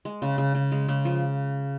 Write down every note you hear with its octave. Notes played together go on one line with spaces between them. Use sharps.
G#3
C#3
C#3
C#3
G#3
C#3
F3